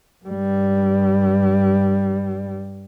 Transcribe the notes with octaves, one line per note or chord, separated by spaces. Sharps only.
G2 G3